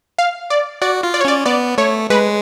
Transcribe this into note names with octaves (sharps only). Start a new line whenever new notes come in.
F5
D5
F#4 D5
F4
D5
C#5
C#4 D5
B3 D5
A3 C#5
G#3 B4